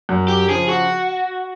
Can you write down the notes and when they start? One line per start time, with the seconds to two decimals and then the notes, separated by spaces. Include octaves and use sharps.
0.09 F#2
0.28 G4
0.49 C#3 F3 G#4
0.69 F#4